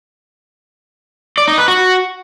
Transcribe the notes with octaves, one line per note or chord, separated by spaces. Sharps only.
D5
D#4
B4
F#4